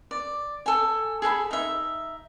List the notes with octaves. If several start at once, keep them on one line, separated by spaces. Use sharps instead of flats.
D5
A4 G#5
G#4 A4 G5 B5
D#4 E5